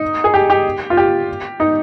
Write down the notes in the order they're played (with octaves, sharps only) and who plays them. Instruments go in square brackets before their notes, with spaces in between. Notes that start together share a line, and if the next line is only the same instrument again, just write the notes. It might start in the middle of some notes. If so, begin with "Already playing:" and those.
Already playing: [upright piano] D#4
G#4
G4
G4
F4
G4
D#4